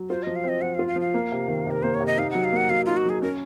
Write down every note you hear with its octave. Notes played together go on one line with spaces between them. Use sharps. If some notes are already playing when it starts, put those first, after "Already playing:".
Already playing: F#3
F4 C5
F3 D#5
F5
C4 D#5
F3 F#5
F5
F4
F5
F3
F5
A#3
C3
D#3
C3 A#4
A#3 C5
C#5
C3
D#5
D#4 F5
F#3 F#5
F5
A#3 F#5
F#3 F5
D#4 F4
F#4
F#3 G#4
C#4 A#4